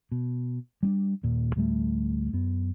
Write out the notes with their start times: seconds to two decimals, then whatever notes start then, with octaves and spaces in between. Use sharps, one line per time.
0.12 B2
0.83 G3 C4 D4
1.23 D#1 A#2
1.56 D2 A2 G3 A3
2.33 F#2 B3